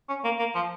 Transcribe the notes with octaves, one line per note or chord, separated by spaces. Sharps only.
C#4
A#3
A#3
F3